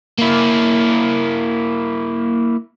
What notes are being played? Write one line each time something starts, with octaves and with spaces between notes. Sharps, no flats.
A#3 E4